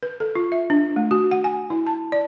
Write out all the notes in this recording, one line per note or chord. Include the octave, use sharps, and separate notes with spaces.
B4
A4
F4
E5
D4
A3
F#4
F#5
G#5
E4
A5
D5